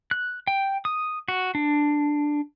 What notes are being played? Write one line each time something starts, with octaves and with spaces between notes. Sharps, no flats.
F#6
G5
D#6
F#4
D4